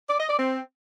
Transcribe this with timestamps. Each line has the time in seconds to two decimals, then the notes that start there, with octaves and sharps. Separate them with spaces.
0.10 D5
0.20 D#5
0.29 D5
0.39 C4